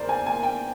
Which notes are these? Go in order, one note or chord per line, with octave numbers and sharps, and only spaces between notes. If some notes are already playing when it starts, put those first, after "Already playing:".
Already playing: F#1 E2 A#4 C5 D5
G#5
G#5
G5